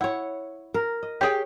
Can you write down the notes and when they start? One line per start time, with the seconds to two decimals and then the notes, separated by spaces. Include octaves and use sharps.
0.01 E4 C#5 F#5
0.74 A#4
1.03 D#5
1.21 G4 G#4 C#5 G5